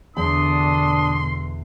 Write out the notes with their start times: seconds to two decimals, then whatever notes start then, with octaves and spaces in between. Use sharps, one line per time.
0.17 E2 B2 D3 D4 C6 D#6